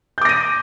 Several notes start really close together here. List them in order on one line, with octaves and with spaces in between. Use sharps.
G6 D6 A#6 D#7